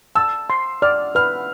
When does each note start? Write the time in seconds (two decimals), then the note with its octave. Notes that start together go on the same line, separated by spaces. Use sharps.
0.15 A5 E6
0.50 C6
0.82 D5 F6
1.15 B4 F6